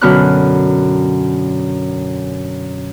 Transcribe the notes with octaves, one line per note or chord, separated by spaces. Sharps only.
F#2 B2 D3 B5 F6 F#6